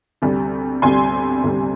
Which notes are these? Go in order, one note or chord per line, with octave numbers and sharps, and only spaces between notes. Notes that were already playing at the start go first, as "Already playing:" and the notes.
D2 C3 G3
D2 C3 G3 G#5 C6
D2 C3 G3